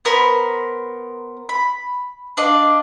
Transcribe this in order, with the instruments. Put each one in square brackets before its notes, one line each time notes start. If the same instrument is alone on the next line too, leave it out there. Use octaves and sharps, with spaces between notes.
[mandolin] B3 A#4 C5 B5
B5
D4 D5 D#5 F5